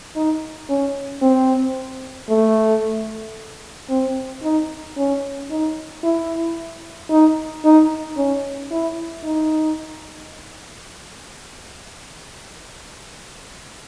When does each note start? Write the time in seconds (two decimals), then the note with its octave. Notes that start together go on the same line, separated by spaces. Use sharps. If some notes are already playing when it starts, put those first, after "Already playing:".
0.16 D#4
0.69 C#4
1.22 C4
2.29 A3
3.90 C4
4.43 D#4
4.97 C#4
5.51 D#4
6.04 E4
7.10 D#4
7.64 D#4
8.17 C#4
8.72 E4
9.24 D#4